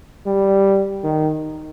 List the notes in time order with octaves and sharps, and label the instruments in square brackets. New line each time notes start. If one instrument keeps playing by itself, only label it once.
[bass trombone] G3
D#3